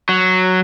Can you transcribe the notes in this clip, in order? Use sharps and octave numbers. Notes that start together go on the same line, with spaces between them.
F#3